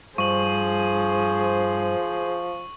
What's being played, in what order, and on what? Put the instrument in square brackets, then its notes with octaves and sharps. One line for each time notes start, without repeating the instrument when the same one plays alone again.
[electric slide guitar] G2 [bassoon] F3 [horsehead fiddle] G#4 C5 [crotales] C#6 F#7